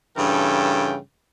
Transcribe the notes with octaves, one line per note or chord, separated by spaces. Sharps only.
G2 C#3 E3 A4 G5